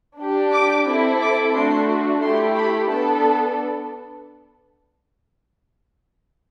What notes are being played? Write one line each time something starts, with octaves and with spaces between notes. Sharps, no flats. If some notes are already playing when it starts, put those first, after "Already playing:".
D4 G4
D6
C4 E4 A4
D6
A3 D4 F#4 C6
A3 E4 G4 C6
B5
B3 D4 A4 A5